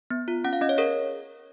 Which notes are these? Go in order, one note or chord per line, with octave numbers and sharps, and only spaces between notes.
B3
F4
C#4 F#5
F5
C#4 D#5
C#5
G#4 A#4